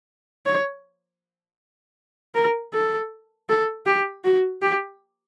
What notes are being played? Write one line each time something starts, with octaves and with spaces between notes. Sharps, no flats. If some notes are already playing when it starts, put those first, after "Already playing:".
C#5
A#4
A4
A4
G4
F#4
G4